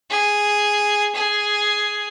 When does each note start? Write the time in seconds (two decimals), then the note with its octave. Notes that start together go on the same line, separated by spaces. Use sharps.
0.11 G#4
1.16 G#4